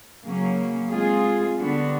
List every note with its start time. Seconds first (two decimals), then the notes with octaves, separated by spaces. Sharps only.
0.24 C#3 F#3 A#3 C#4
0.91 G#3 C4 F4 G#4
1.57 D3 G3 B3 D4 F#4